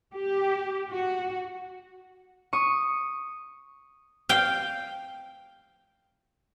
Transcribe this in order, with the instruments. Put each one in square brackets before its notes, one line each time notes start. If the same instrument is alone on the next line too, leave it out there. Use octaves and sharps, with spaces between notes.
[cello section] G4
F#4
[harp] C#6 D#6
[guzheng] F5 G5